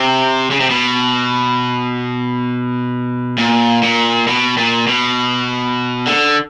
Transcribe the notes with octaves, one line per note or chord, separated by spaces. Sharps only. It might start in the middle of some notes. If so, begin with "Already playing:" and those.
Already playing: C3
C#3
C3
B2
A#2
A#2
B2
A#2
B2
D3